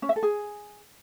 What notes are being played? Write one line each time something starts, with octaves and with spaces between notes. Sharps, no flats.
C#4
E5
A4
G#4